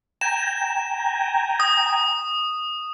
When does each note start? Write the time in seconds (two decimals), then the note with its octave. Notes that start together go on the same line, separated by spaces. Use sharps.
0.21 G5 G#5 A#5 E7
1.60 D#6